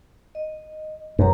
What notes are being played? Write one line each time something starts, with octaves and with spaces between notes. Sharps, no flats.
D#5
F#2 B4 A#5